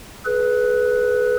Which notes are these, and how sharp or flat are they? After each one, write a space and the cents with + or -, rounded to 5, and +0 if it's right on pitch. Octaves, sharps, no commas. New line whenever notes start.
G#4 +35 B4 +0